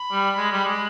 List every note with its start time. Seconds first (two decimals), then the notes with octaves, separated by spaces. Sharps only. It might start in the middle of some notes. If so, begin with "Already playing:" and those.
Already playing: B5
0.12 G3
0.38 G#3
0.52 G3
0.65 G#3